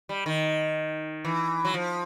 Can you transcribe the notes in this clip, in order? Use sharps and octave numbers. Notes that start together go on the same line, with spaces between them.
G3
D#3
E3
F#3
F3